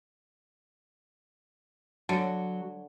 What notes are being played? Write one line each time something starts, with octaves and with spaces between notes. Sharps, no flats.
D3 F#3